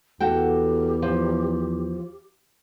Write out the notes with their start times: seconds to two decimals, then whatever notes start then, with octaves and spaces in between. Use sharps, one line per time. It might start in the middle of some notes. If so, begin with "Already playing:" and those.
0.20 E2 F#4 G4 A4 G5
1.02 F3